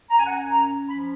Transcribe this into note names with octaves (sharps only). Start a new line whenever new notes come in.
F#2 A#5
G#5
F#5
G#5
C#4 A#5
F3 B5